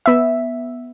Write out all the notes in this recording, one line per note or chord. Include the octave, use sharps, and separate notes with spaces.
B3 E5